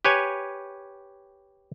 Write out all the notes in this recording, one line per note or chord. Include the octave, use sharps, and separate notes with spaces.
G4 B4 C#5 G#5